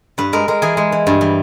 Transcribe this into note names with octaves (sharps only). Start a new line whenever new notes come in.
G2 B4
G#3 A#4
G#3 A#4
E3 G#4
G#3
E3
G2
E3